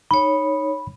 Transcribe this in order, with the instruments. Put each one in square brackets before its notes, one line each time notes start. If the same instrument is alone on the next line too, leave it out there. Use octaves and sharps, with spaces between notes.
[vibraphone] D#4 C#5 [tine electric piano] B5